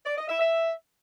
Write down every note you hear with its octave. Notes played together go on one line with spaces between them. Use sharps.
D5
D#5
E5
E5